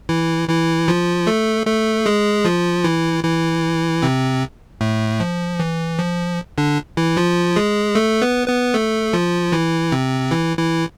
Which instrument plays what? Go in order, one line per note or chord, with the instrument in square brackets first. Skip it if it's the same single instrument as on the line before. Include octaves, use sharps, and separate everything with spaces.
[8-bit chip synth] E3 E4
E3 E4
F3 F4
A3 A4
A3 A4
G#3 G#4
F3 F4
E3 E4
E3 E4
C3 C4
A2 A3
F3
E3
F3
D3 D4
E3 E4
F3 F4
G#3 G#4
A3 A4
B3 B4
B3 B4
A3 A4
F3 F4
E3 E4
C3 C4
E3 E4
E3 E4